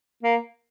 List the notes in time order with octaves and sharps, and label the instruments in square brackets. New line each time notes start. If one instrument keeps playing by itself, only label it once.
[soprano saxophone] A#3